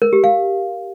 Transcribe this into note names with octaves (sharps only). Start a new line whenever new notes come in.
A#4
G4
F5